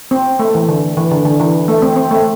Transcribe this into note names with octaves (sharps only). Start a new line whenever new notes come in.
C4
A3
E3
D3
E3
D3
D3
E3
A3
C4
C4
A3